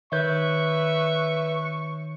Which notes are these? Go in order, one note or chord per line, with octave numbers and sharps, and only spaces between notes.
D#3 B4 C#5 E5 C#6 G6